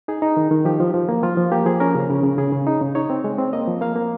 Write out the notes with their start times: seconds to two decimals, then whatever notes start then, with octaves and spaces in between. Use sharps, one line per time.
0.08 D#4 G#4
0.22 D#4
0.37 D#3
0.51 D#3
0.65 F3 G4
0.80 F3
0.94 F3
1.09 A#3
1.23 F3 F4
1.37 F3
1.51 A#3 G4
1.66 F3 G#4
1.80 C#4 A#4
1.95 C#3
2.09 C#3
2.24 C#3
2.38 C#3 G#4
2.52 C#3
2.67 D#4
2.81 C#3
2.95 D#4 C#5
3.10 C4
3.24 G#3
3.39 C4
3.53 A#3 D#5
3.67 F3
3.81 A#3 F5
3.96 A#3